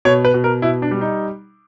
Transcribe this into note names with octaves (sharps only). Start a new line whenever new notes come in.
B2 C#5
B4
B2
A#4
B2 E4
D4
G3
D#4